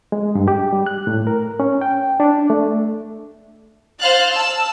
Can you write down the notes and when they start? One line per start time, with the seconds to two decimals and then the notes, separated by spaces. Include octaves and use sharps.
0.12 G#3
0.35 G2
0.48 G4
0.73 G3
0.86 F#6
1.07 A2
1.27 A#4
1.60 C#4
1.81 G5
2.20 D4
2.50 A3
3.99 C5 F5 F6 F#6 A6
4.33 A5 E6